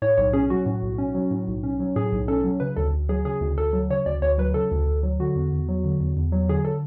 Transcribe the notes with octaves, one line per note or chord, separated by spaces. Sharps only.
A2 C#5
B1 C#5
C#4 G#4
F#3 F#4
A2
B1
C#4
F#3
A2
B1
C#4
F#3
A2 G#4
B1
C#4 A4
F#3
C#3 B4
D2 A4
D2
F#3 G#4
C#3 G#4
D2
D2 A4
F#3
C#3 C#5
D2 D5
D2 C#5
F#3 B4
C#3 A4
D2
D2
F#3
D3 F#4
E2
E2
F#3
D3
E2
E2
F#3
D3 G#4
A4